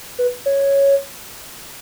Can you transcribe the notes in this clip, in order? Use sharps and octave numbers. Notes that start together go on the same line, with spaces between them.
B4
C#5